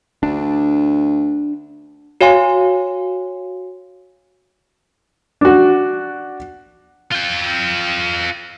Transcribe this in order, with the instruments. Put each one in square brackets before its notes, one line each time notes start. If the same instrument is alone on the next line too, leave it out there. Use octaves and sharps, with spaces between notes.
[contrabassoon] D2 [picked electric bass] D4
[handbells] F#4 C#5 F5 G#5 C6
[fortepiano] D4 F#4
[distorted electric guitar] F4 G5